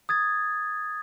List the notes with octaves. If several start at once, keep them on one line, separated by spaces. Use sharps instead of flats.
D#6 G#6 A6